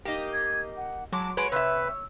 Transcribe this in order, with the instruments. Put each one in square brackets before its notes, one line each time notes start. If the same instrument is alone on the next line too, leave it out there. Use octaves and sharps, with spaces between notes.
[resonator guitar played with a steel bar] A#3 D#4 [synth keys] G4 D#5
[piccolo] G#6
F#5
[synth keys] F#3 D6 [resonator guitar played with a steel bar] G#3 [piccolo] A5
[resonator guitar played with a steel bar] F#3 G#3 B4 [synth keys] C#5 [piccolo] D7
[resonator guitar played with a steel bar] C3 E5 [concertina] B4 [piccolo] E6